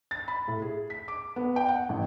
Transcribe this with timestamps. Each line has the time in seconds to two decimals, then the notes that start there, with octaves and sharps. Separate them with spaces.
0.11 A6
0.28 B5
0.48 A2
0.62 G#4
0.90 B6
1.08 D6
1.36 B3
1.56 G5
1.68 F#5
1.89 A1